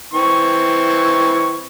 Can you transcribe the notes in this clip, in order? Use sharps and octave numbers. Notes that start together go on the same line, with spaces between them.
E3 C4 C#6